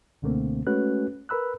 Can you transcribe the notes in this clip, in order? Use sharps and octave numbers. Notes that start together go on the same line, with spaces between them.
C#2 B2 D3 A3 A#3 C4
G#3 A3 C#4 F#4 B4 F#6
A#4 B4 B5 E6 F#6